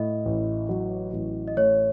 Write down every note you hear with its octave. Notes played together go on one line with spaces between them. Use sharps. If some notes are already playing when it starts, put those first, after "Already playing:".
Already playing: A2 D#5
A1
F#3
A1
D#5
A2 C#5